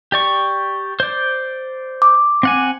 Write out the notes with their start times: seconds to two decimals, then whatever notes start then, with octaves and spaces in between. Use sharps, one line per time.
0.12 G4 D5 C#6
1.00 C5 D5
2.02 D6
2.43 C4 F#5 G#5